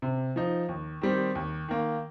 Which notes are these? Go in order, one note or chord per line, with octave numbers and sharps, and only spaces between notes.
C3
F3 D#4
D#2
D#3 G3 C4
D#2
D#3 A#3